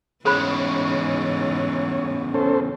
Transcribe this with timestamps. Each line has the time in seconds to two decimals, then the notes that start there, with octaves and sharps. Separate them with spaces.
0.25 E2 G#2 C#3 E3 G#4 C5 C#5 B5
2.34 C#4 A4 C5